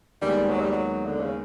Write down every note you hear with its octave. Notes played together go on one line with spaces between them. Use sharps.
D#2 D#3 G3 G#3 B3 D#4
F#3
G3
F#3
D3
C#3